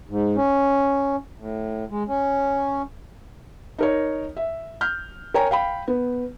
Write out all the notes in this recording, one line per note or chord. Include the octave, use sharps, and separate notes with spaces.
G#2
C#4
A2
G#3
C#4
D#4 A#4 C#5
E5
F6 G6
A#4 C#5 G5 G#5 A#5
F5 G5 B5
B3